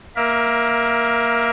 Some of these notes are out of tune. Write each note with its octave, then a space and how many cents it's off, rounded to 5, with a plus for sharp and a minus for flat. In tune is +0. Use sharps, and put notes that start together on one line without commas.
A#3 +0 A#4 +20 E5 +0